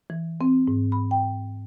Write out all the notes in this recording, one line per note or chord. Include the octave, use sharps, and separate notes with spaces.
E3
C4
G#2
B5
G5